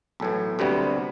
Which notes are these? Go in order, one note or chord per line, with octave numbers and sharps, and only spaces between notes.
B1 A2 E3
D2 C3 G3 B3